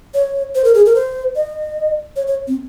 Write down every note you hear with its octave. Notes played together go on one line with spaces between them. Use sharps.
C#5
C5
A#4
G#4
A#4
C5
D#5
C#5
C#5
C4